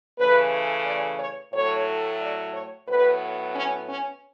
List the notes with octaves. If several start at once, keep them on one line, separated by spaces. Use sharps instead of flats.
C#3 E3 A3 B4
D5
C#5
A2 F#3 A3 C#5
D5
C#5
A2 F#3 B3 B4
C#4
C#4